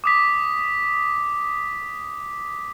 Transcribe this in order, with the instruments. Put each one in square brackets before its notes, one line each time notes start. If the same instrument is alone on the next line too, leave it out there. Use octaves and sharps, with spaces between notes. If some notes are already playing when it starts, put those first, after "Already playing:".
[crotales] D6 D#6 B6